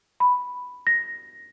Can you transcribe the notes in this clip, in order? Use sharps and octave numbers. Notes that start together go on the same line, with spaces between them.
B5
A#6